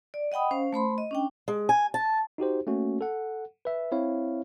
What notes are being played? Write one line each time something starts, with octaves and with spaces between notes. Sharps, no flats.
D5
D#5 F#5 G5 B5 D#6
C#4 C5 F5
A3 C5 B5 C6
D#5
C#4 D4 G5
G#3
G#5
A5
D#4 F#4 G4 C5
A3 A#3 C#4 F#4
A4 F#5
B4 E5
C4 E4 C#5 F5